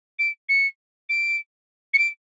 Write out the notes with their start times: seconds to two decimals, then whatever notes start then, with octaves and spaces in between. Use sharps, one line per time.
0.19 D7
0.49 C#7
1.09 D7
1.93 C#7
1.98 D7